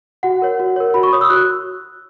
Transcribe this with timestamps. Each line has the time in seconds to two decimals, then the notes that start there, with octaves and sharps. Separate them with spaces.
0.23 F#4 F#5
0.42 A#4 C#5
0.60 F#4
0.76 A#4 C#5
0.94 F#4 B5
1.03 C#6
1.13 C#5 D#6
1.21 E6
1.30 F#4 F#6